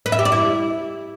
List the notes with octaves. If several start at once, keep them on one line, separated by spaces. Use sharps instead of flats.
B4
E5
G4
D5
E4